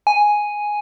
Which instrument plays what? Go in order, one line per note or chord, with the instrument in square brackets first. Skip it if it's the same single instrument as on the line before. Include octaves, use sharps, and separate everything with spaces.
[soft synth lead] G#5